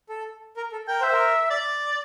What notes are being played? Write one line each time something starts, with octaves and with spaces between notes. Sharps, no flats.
A4
A#4
A4
A#4 G5
C5 E5
A#4
D5